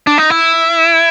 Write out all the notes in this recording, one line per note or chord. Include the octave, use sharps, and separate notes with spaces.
D4
D#4
E4